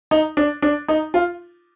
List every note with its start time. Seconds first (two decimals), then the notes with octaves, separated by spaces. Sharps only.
0.11 D#4
0.37 D4
0.62 D4
0.88 D#4
1.14 F4